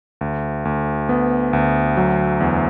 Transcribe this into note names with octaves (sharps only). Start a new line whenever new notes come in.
D2
D2
B3
D2
F#3
E2